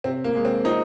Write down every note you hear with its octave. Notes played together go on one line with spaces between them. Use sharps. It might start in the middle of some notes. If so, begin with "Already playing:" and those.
C3 C4
A#3
G#3
C4
F3 C4 D#4